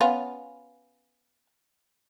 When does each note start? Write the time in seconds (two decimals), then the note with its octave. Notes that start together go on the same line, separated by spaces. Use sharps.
0.01 B3 C#4 F4